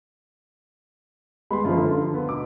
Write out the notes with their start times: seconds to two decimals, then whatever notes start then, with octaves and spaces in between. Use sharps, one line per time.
1.51 G3 G#3 B3 B5 C6
1.65 F#2 F3 F4
1.77 D3
2.14 B3
2.29 B2 D6